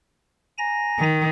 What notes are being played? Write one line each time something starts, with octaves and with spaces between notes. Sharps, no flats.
G#5 A#5 A#6
D#3